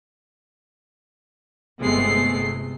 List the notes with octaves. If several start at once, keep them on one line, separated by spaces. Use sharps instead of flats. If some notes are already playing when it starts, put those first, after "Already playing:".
G1 C3 G#3 A3 B3 C7